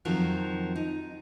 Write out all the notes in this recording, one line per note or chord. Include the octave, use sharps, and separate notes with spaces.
F2 D#3 F3 F#3
D#4